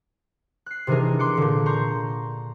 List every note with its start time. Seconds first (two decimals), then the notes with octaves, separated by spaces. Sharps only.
0.66 F#6 C7
0.87 C3 D#3 E3 D4 G#4 A#4
1.19 C6 D6 F#6 C#7
1.37 A#2 D3
1.66 A#5 C6 C#6 G6